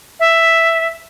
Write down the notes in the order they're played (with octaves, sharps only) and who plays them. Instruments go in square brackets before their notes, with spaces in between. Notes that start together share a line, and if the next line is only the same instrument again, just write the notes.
[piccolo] E5